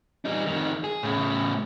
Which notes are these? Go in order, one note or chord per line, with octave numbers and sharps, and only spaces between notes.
G3 D#4
F2 D#3
G#4
A2 C#3